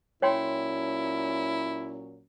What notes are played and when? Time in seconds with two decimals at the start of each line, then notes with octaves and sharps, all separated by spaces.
0.22 A#2 F#3 C#4 E4 C#5 G5 C6